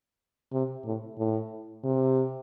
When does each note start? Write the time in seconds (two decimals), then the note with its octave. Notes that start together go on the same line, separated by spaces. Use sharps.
0.53 C3
0.85 A2
1.18 A2
1.84 C3